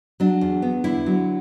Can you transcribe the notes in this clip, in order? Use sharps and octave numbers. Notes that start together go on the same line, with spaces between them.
F#3 D4
E2
B3
D3 E4
F#3